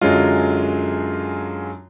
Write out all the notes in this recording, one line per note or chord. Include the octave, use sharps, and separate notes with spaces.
F#2 D3 F#3 G#3 F4